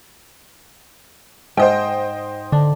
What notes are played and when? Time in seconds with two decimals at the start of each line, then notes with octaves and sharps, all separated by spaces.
1.57 G#2 C5 D#5 G5
2.52 D3 D4